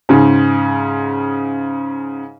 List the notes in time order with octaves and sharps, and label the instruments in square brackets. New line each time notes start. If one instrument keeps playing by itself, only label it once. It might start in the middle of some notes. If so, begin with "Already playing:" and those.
[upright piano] G#2 C#3